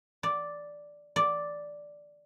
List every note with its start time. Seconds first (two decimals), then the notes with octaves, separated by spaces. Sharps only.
0.23 D5
1.16 D5